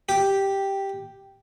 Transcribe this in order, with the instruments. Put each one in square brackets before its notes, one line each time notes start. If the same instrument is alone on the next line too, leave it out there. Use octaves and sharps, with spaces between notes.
[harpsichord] G4